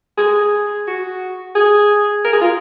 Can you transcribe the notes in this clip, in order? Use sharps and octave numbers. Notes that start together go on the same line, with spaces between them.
G#4
F#4
G#4
A#4
G#4
F4